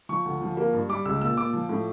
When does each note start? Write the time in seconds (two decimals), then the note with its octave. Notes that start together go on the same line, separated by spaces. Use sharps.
0.09 F3 C#6
0.25 D2
0.41 F3
0.57 A#3
0.73 G2
0.89 G3 D6
1.05 C#2 E6
1.21 A#2 E6
1.37 A#2 D6
1.53 F3
1.69 A2